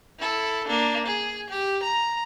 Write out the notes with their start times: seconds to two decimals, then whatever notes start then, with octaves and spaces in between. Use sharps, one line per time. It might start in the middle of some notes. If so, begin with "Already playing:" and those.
0.19 E4 A4
0.68 A#3 D4
1.07 G#4
1.50 G4
1.83 A#5